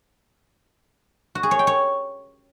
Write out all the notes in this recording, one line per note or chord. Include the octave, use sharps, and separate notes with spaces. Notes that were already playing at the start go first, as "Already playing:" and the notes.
F#4
G#4
C#5
G5
C#5